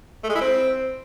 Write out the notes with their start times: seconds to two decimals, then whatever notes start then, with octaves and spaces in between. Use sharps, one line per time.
0.24 A3
0.29 G#3
0.35 E4
0.41 C4